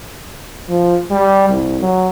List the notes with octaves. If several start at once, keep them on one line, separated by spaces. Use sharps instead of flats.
F3
G3
C2
F#3